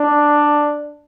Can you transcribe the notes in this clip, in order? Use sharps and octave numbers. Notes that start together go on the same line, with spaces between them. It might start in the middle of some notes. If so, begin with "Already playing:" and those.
Already playing: D4